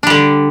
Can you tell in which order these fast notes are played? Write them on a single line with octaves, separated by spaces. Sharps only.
D4 G3 D3